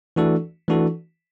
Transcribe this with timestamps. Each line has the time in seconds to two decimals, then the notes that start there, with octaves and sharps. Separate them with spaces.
0.16 E3 A3 D4 F#4 A4
0.68 E3 A3 D4 F#4 A4